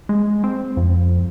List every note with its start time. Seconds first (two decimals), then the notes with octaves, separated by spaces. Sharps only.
0.09 G#3
0.44 C4
0.77 F2